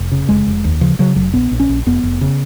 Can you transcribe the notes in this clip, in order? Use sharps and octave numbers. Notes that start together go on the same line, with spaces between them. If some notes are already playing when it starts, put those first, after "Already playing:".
Already playing: F1
C#3
F1 G#3
F1
D#2
C#3 F3
C#3 F#3
F1 F#3
A#1 B3
A#1
C#4
A#1
F1 B3
F1
C#3